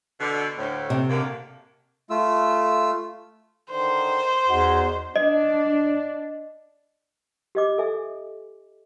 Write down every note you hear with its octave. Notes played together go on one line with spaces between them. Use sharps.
B2 D3
D2 A2
C3
F#2 D3 A#3
A3 F4 E6
D3 D#3 C5
E2 D#4 F#4
D4 D#5
G4 D#5 D6
A4 E5 G#5